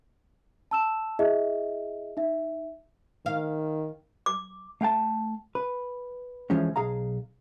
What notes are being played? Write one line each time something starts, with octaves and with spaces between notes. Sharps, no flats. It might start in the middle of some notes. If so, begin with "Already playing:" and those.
A5 E6 E7
E4 G#4 D#5 E5
D#4 E5
D#3 F5
D6
A3 F5 G5 A5
B4
D2 E3 F3 G#3 C#4
B1 G#4 F5 A#5